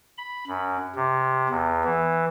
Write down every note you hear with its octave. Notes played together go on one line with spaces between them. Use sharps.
B5
F#2
C3
E2
E3